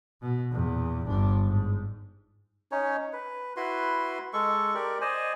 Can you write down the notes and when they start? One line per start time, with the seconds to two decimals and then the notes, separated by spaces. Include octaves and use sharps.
0.22 B2
0.52 E2 A#2
1.08 G1 D4
1.45 G#2
2.72 C#4 D#4 C#5
3.13 B4
3.56 E4 F#4 B4 C6
4.33 G#3 A4 C#6
4.74 G4 A#4 D5
5.01 C5 D5 D#5 G#5